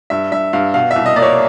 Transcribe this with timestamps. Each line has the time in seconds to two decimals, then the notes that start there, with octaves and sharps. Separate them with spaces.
0.10 G2 E5
0.32 G2 E5
0.53 G2 F5
0.74 B2 F5
0.91 E5
0.96 C2
1.06 D#5
1.16 A#3 D5
1.22 C#5